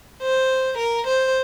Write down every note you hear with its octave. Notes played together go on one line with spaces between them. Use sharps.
C5
A#4
C5